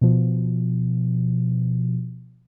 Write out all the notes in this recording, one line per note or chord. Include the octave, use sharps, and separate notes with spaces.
B2 F3